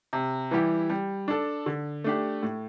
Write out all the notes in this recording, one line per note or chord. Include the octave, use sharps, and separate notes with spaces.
C3
E3 G3 E4 G4
G3
D4 A4
D3
A3 D4 G4
A2